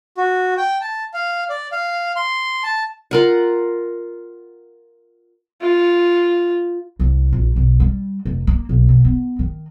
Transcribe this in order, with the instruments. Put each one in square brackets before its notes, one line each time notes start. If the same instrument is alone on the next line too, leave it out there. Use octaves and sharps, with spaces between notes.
[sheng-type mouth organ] F#4
G5
A5
F5
D5
F5
C6
A5
[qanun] F4 A#4 F#5
[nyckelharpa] F4
[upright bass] C2
A#1
B1
G3
F1
A#3
B1
B2
B3
D#3